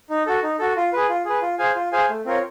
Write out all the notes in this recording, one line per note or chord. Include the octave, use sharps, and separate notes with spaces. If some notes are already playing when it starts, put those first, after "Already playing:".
D#4
F#4 A4
D#4
F#4 A4
F4
G#4 B4
F4
G#4 B4
F4
G#4 C5 F5 G#5
F4
G#4 C5 F5 G#5
A3
C4 F4 A#4 C#5